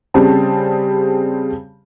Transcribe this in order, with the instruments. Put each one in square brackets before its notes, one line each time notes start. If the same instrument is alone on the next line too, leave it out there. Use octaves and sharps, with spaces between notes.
[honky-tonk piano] C#3 G3 C4 G#4 A5